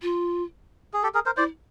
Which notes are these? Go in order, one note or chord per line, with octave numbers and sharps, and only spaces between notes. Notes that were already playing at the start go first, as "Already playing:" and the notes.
F4
G#4
G4 A4
G#4 A#4
A#4 C5
E4 C5 D5